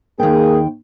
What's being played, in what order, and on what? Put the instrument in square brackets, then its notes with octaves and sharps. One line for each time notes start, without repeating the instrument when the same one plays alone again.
[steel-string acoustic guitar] D#2 G5 [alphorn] A#3 [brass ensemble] G#4